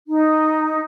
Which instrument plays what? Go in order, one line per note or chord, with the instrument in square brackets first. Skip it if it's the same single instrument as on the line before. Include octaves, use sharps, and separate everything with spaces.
[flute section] D#4